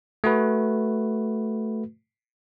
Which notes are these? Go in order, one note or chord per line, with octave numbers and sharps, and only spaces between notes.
A3 F#4 B4